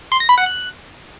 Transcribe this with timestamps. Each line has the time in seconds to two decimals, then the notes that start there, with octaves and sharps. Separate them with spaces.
0.12 C6
0.20 A#6
0.29 B5
0.38 F#5
0.46 F#6